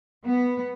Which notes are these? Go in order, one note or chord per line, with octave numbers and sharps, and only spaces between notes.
B3